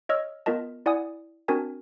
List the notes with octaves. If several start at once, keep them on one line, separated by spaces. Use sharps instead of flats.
C#5 D#5 E6 F6
B3 F4 A#4 D#5 A5
E4 D5 F#5 G#5 D#6
C4 D4 F#4 A#4 G#5 A5